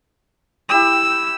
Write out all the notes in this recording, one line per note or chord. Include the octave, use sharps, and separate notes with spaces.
E4 G4 G5 E6